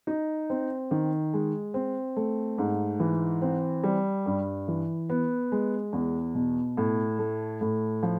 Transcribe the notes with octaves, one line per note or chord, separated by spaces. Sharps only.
D#4
C4
D#3
G#3
C4
A3
G#2
E3
C4
G3
G2
E3
B3
G#3
E2
B2
A2
A3
A2
F3